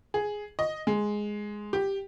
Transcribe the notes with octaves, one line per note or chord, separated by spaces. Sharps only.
G#4
D#5
G#3
G4